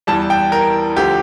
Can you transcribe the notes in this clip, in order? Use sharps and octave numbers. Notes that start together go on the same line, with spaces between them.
E2 E3 G3 A5
G5
A#4
D2 D3 F3 G4